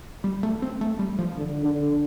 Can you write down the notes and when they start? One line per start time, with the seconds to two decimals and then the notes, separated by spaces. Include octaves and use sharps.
0.24 G3
0.43 A3
0.62 C4
0.81 A3
0.99 G3
1.19 F3
1.37 D3
1.65 D3